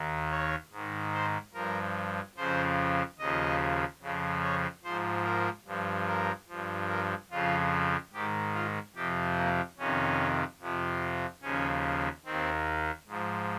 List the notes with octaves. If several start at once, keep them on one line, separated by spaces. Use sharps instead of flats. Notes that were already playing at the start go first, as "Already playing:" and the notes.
Already playing: D#2 D#3
C#5
G#2 D#3
C5
G2 F3 A#4
F2 C#3 F3 C5
D#2 C#3 F3 D#5
F2 C#3 F3
C#5
G#2 F3 C5
A#4
G2 F3
A#4
G2 F3
A#4
F2 C#3 F3 F4
G#2 D#3 G4
F4
F2 C3 F3 G4
A#3
F2 C3 D#3 C#4
F2 C3 F3
D#2 C#3 F3 C#4
D#2 D#3 C4
G#2 F3